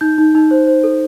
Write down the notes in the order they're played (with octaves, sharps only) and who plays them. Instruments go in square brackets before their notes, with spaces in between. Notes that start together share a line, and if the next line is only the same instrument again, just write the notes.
[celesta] D#4 G6
D#4
D#4
C5
C5
A4